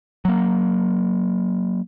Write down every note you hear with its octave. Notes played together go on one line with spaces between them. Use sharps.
F#3 A#3